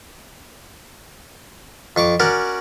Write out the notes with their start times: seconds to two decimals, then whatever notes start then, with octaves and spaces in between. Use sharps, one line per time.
1.96 F2 C#6 D6
2.20 C#4 F#4 A#4 D5